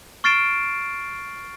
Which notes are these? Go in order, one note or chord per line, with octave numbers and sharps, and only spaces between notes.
C#6 F6 A6 C7 D7 E7